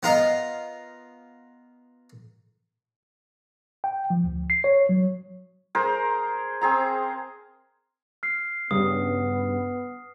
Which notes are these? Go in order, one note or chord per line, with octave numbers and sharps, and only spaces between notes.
B3 F4 A#4 D#5
G5
F3
D2
C7
C#5
F#3
G#4 A#4 C5
C4 G#4 A#5
F6 C7
G2 C#3 B3 D#6